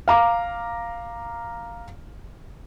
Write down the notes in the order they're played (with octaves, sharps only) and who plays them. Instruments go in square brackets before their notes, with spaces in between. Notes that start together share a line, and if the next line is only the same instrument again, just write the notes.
[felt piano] F5 A#5 D6